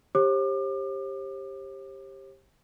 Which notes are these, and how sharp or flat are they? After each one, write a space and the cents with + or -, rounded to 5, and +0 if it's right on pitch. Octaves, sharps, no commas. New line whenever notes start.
G4 +10 C5 +45 D6 +35